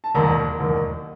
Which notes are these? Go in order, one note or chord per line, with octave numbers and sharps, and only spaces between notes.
A5
E1 D#2 D#3 A#5
E1 D#2 D#3